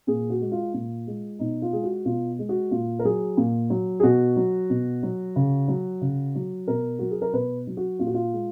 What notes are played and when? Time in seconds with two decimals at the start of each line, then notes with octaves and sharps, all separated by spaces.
0.07 A#2 G#4
0.30 F#4
0.41 G#3
0.52 F4
0.74 A#2 F4
1.07 G#3
1.39 B2 D#4
1.62 F4
1.73 G#3 G#4
1.83 F#4
2.05 B2 F4
2.39 G#3
2.49 F#4
2.71 A#2 F4
2.99 A#4
3.04 F#3 G#4
3.37 A#2
3.70 F#3
4.00 G#4
4.03 B2 F#4
4.36 F#3
4.70 B2
5.03 F#3
5.36 C#3
5.68 F#3
6.01 C#3
6.35 F#3
6.67 B2 A#4
6.99 F#3 F#4
7.11 G#4
7.22 A#4
7.33 B2 B4
7.67 F#3
7.77 F#4
7.99 A#2 F4
8.07 F#4
8.14 F4
8.33 G#3